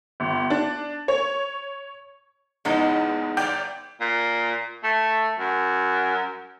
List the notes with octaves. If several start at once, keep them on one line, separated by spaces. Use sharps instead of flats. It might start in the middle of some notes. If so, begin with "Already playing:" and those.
G1
D4
C#5
F#1 E2 G#3 B3 D#4
G1 D5 G5
A#2
A3
F#2